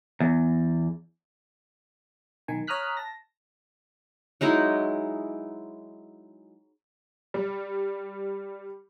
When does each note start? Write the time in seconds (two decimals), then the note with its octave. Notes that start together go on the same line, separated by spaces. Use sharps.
0.20 E2
2.48 B1 D#3 G#5
2.67 C#5 A#5 D#6 F6 F#6 B6
2.97 A5 A#6
4.41 F#3 G#3 D#4 E4
7.34 G3